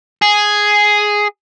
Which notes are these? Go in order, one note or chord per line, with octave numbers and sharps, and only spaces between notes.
G#4